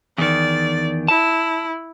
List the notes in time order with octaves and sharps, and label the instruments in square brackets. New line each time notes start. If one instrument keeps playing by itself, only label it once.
[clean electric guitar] E2 D#3 [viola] D5
[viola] E4 [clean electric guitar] A5